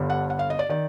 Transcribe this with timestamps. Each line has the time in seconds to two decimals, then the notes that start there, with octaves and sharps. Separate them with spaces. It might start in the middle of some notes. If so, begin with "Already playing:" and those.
Already playing: G1 G2 D3
0.10 F#5
0.30 F#5
0.39 F5
0.50 D#5
0.59 D5
0.69 D#3 D5